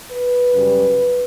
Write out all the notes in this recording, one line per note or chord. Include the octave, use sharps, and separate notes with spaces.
B4
F#2 C#3 G3